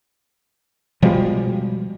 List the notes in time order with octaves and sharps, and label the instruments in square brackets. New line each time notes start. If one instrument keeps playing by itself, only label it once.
[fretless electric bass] B2 F3 G3 G#3